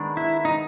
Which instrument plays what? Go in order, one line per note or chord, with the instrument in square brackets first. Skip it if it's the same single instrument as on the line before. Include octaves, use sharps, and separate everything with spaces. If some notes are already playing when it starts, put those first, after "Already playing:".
Already playing: [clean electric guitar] D#3 G#3 B3 D4
[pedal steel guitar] E4
D#4